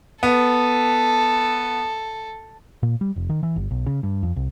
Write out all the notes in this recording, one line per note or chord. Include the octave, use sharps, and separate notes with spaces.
B3 A4
A#2
G3
F1
D#3
E3
G1
B1
C#3
G2
F2
C2